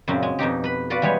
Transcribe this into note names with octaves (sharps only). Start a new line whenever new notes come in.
F#2 A#2 C#3 F#3 C4
G#3
F2 B2 D#4 G4
B4 B5
F4 F#4 B4 D5
E3 G3 G#3 G4 C#5